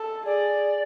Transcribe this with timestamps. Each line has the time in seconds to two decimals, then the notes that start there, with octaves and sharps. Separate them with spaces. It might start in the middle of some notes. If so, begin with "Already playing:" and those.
Already playing: A4
0.25 G#4 D5